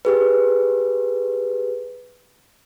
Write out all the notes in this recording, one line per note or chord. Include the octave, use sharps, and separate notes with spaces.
G4 G#4 B4